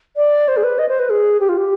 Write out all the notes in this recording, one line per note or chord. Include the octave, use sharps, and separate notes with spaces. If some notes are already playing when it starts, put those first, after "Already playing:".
D5
C5
G#4
B4
D#5
C5
B4
G#4
G4
F4
G4